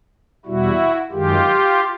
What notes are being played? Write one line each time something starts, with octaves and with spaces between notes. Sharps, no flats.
E2 B2 G3 E4 F#4
F#2 D#3 G#3 F4 G4